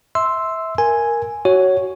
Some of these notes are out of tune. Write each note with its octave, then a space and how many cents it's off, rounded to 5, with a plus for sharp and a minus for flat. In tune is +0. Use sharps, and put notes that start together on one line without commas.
E5 -20 C6 +0 E6 +0
A#4 +0 G#5 +0
F#4 +20 C#5 +0